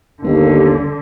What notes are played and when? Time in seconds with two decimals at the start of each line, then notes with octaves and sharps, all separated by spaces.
0.23 G1 D#2 D3